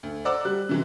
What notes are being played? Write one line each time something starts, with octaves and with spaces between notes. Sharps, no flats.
D2
C5 D5 F#5 A#5 D6 E6
G3 F#6
C3 E3 G#3